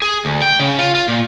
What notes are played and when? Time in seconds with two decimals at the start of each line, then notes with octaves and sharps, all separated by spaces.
0.02 G#4
0.25 D2
0.42 G5
0.59 C#3
0.79 F4
0.95 F4
1.08 A#2